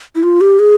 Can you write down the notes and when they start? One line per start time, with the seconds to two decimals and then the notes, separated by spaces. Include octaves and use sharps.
0.15 E4
0.23 F4
0.41 G4
0.59 G#4